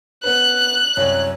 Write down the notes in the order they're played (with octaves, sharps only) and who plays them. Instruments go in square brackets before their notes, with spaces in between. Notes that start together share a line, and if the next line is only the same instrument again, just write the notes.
[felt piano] B3 C#4 B4 [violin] F#6
[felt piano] C2 F#2 [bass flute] C#5